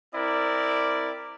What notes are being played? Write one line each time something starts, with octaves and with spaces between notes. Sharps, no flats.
C4 E4 A#4 D5